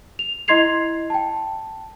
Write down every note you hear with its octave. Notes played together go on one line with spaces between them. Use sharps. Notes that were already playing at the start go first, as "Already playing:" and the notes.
F7
E4 D#5 C6 G#6 C7 F7
G5 A5